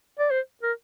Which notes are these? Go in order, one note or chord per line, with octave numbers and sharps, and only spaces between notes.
D5
C5
A#4